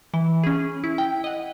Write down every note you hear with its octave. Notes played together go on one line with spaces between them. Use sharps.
E3
C#4 G#4
E4
G5
D#5 F#5